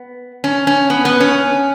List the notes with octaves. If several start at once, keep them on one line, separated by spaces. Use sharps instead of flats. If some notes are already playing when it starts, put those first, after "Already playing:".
Already playing: B3
C#4
C#4
B3
B3
C#4